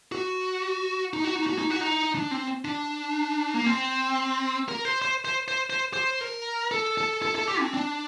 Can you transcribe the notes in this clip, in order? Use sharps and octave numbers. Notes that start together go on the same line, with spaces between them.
F#4
D#4
F#4
D#4
F#4
D#4
F#4
D#4
D4
C4
D4
A#3
C4
A#4
C5
C5
C5
C5
C5
C5
A#4
A4
A4
A4
A4
G4
C4
D4